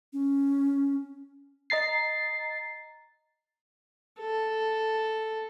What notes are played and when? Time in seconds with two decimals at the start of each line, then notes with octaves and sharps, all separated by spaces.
0.13 C#4
1.70 D#5 A#5 A6 C7
4.20 A4